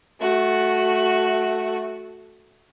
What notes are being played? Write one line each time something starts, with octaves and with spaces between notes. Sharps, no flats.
A3 F#4